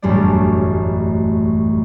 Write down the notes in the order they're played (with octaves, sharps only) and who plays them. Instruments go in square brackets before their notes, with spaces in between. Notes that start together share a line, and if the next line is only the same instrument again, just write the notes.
[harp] E1 A1 F#2 G3 A3 D5